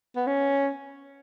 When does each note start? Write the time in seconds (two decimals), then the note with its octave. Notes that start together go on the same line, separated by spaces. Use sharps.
0.16 B3
0.27 C#4